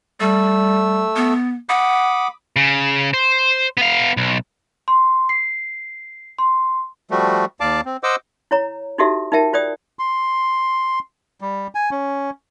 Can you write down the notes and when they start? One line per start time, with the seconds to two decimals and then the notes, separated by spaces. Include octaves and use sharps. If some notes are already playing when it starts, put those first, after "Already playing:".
0.20 G3 A3 E6
1.16 B3
1.69 F#5 B5 D6 D#6
2.56 C#3
3.14 C5
3.77 B3 F5
4.17 B1
4.88 C6
5.29 C7
6.39 C6
7.11 F3 G3 A3 F#4
7.60 D#2 D5 F5 A5 D6
7.85 C4
8.03 C5 D#5 F#5 D6 E6
8.51 E4 C#5 A#5
8.98 D#4 E4 F#4 G4 A4 E5
9.32 D#4 F4 A#4 E5 G5 A5
9.53 F4 C5 D5 G5 D#6
9.99 C6
11.41 G3
11.75 G#5
11.91 C#4